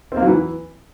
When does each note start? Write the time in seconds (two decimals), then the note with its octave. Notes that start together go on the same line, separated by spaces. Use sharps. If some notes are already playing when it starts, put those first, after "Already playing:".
0.12 C4
0.17 A#3
0.22 F#3
0.27 E3